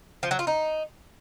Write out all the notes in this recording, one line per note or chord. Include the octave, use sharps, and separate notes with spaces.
F3
F#3
F4
D#4